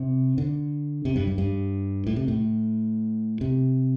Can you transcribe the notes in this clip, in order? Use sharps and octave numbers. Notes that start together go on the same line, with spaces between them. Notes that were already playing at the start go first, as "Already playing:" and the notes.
Already playing: C3
D3
C3
G2
G2
G2
A2
C3
A2
C3